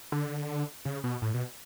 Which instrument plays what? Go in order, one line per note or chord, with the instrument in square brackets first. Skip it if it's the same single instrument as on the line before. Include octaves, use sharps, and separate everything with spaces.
[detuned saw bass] D3
C#3
B2
A2
B2